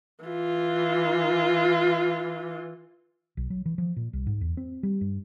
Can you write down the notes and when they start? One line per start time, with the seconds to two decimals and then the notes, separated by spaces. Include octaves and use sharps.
0.25 E3 F4
3.37 B1
3.50 F#3
3.66 E3
3.78 F3
3.96 A#2
4.13 C2
4.27 G#2
4.41 E2
4.57 C4
4.83 G3
5.01 G2